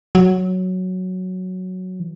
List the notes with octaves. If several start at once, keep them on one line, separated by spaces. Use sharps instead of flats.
F#3
E3